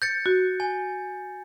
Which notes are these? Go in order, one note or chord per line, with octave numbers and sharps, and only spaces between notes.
G6 A6 C#7
F#4
G#5